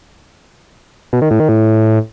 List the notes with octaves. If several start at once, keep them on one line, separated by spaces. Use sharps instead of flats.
B2
D#3
A2
D#3
A2